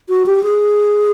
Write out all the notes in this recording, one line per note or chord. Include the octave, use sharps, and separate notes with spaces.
F#4
G4
G#4